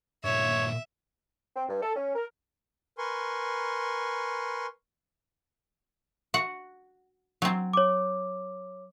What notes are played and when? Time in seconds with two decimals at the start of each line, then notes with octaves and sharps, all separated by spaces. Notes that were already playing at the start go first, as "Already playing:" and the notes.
0.25 G2 A#2 C#5 E5
1.56 C4
1.69 G2
1.82 A4
1.96 C#4
2.15 A#4
2.98 A#4 B4 G#5 C6 C#6
6.34 F#4 F#5
7.42 F#3 C4
7.73 C#5 D6